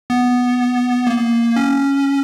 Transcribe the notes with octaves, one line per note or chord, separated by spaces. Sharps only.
B3
A#3
C#4